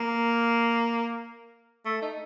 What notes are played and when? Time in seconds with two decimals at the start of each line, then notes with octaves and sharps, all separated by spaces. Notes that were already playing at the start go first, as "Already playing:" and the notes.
Already playing: A#3
1.85 A3
2.02 D#4